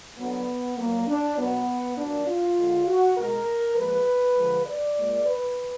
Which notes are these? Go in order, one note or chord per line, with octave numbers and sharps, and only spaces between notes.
D3 F#3 B3
A#2 F#3 A#3
D4
B2 F#3 B3
A#2 F#3 D4
F4
D3 G#3
F#4
B2 G#3 A#4
A#2 F3 G#3 B4
D3 F3 G#3
D5
A#2 G#3
B4